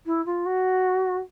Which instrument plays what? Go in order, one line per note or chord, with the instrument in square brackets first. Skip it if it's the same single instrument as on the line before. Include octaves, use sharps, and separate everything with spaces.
[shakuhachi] E4
F4
F#4